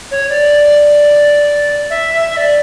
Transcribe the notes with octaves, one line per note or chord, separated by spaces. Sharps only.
C#5
D5
E5
E5
D5